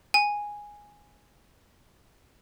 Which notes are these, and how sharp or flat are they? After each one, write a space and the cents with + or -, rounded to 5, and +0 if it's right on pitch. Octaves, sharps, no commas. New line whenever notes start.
G#5 -5